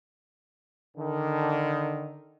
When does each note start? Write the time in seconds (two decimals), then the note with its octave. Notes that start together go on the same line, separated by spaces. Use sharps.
0.97 D3 D#3